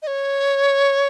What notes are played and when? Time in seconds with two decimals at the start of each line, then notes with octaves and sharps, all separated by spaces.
0.02 D#5
0.07 C#5